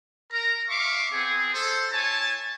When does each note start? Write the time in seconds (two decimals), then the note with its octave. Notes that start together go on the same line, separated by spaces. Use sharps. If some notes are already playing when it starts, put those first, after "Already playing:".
0.32 A#4 A#5
0.69 E5 F5 C#6 D6
1.12 B3 C4 G#4
1.54 A4 C5
1.91 E4 C#5 G#5 A5